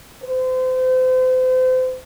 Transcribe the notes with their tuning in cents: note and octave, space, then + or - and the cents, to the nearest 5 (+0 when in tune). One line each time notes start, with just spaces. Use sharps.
C5 -35